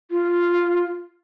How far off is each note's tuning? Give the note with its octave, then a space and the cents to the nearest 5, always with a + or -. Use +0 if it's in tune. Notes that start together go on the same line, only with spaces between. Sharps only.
F4 -5